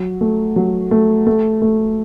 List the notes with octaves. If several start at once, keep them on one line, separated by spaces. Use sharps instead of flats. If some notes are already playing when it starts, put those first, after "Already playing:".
Already playing: F#3
A3
F#3
A3
A3
A3